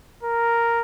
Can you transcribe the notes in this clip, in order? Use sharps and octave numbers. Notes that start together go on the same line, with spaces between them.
A#4